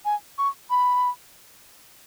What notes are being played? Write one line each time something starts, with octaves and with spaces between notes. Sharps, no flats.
G#5
C#6
B5